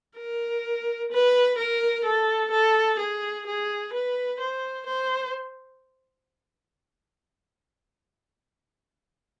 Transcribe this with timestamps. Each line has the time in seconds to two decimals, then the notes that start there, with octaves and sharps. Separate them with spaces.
0.18 A#4
1.12 B4
1.59 A#4
2.05 A4
2.52 A4
2.99 G#4
3.47 G#4
3.94 B4
4.40 C5
4.86 C5